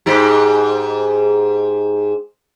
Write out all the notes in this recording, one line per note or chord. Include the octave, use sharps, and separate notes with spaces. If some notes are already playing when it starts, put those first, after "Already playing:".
G#2 D#4 G4